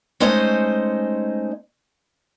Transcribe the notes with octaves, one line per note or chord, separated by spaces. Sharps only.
G#3 A3 C#4 D#4 C5 D#5